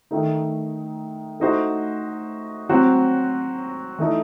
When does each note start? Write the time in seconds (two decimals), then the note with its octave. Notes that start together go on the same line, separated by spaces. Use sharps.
0.11 D#3 A3 D#4
1.40 A3 D#4 F#4 C5
2.69 F#3 C4 F#4 C5
3.99 E3 A3 D#4 A4